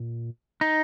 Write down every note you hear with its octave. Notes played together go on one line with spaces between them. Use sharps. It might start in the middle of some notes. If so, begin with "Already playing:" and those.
Already playing: A#2
D#4